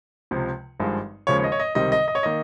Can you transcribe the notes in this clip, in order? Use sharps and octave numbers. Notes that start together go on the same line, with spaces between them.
C#2 C3 F3
G#1 G2 F3 G#3
D#2 C#3 F3 G#3 C#5
C#5
D#5
C#5
D#5
C#2 C3 D#3 G3 C4 D#5
D#5
D#5
C#5
D#3 A#3 D#5